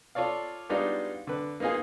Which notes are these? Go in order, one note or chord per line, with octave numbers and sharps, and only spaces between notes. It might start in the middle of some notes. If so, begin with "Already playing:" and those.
F4 A4 C#5 D5 F5
G3 G#3 B3 D4 D#4 F4
D3 B4
A#3 B3 D#4 F4 G#4